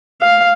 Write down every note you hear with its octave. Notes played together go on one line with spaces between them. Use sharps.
F5